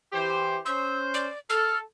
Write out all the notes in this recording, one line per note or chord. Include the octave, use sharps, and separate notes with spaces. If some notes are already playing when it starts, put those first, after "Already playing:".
E3 G4 C5
C#4 C5 E6
D5
A4 F6